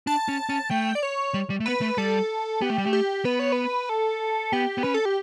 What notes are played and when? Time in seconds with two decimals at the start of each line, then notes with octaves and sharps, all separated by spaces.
0.07 D4 A5
0.28 C#4
0.49 C#4
0.70 A3 G5
0.95 D5
1.03 C#5
1.34 G3
1.50 G3
1.60 A3
1.66 B3 B4
1.81 A3
1.98 G3 A4
2.61 B3 G4
2.70 A3
2.78 G3
2.86 A3
2.93 G4
3.25 B3 B4
3.39 C#5
3.52 B4
3.89 A4
4.53 B3 G4
4.78 B3
4.83 C#4 B4
4.94 A4
5.05 G4